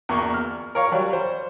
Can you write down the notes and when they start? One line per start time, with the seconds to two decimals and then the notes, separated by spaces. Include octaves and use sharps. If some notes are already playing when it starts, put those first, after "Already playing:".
0.09 E2 A#3 C#6
0.34 F6
0.75 A#4 C#5 F5
0.92 F#3 G3
1.13 C5